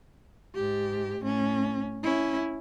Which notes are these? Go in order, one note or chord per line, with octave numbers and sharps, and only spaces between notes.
G#2 G4
A2 C#4
C#4 E4